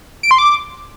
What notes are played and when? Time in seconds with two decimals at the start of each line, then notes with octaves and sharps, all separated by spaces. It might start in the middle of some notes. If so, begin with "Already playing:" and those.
0.23 D7
0.31 C6
0.38 D6